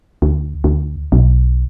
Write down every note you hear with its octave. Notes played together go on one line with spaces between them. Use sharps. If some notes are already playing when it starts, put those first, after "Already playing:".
D2
D2
B1